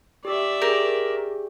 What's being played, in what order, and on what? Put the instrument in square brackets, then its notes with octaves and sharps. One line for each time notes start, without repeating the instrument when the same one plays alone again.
[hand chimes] G4 [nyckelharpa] D5 E5
[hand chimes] G4 G#4 G6 [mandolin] A#4